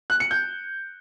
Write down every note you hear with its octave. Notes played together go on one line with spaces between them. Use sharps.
F#6
C#7
G6